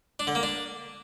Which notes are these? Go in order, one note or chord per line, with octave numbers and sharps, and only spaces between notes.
D4
D3
A#3
D4